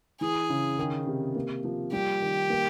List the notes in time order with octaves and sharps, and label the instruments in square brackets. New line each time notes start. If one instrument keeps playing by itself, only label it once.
[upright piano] E3 [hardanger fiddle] G#4
[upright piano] C#3
D#3
C3
A#3
F3
[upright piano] G3 [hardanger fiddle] G4
[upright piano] D#3
A#3